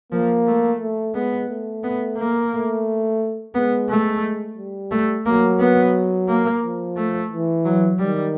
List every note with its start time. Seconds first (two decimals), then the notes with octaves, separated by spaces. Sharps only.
0.12 F3 A#3
0.47 A3
0.80 A3
1.14 G#3 B3
1.49 A3
1.84 B3
2.17 A#3
2.52 A3
3.54 G#3 B3
3.89 A3
4.57 G3
4.91 A3
5.26 F#3 A#3
5.60 B3
6.29 A#3
6.62 F3
6.97 A3
7.31 E3
7.65 F#3
7.99 D#3 G3